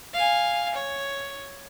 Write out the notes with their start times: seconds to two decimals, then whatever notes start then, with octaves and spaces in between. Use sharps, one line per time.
0.14 F5 G#5
0.75 C#5